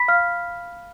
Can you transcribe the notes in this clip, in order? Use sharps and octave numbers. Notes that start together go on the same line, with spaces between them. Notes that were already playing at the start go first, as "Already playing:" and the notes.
Already playing: B5 B6
F5 F6